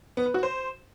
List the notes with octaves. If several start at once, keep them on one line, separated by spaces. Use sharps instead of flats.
B3
B4
F#4
C5